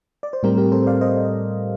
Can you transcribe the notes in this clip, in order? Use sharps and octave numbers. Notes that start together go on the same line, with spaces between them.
D5
C5
A2 G3 C4 G4 A#4
G4 A#4
A4 C5
D5 F5
C5 D#5